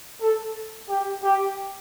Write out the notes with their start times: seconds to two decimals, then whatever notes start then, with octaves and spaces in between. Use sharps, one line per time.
0.21 A4
0.89 G4
1.23 G4